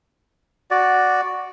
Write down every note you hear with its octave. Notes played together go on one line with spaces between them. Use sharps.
F#4 D5